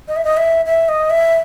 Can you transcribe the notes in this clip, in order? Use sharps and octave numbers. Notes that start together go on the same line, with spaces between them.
D#5
E5
D#5
E5
E5
D#5
E5